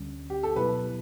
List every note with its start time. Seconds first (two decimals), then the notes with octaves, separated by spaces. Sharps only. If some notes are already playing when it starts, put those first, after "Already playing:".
Already playing: D2 D3 G3 C#4
0.30 G4
0.43 A4
0.56 B2 F#3 B3 E4 B4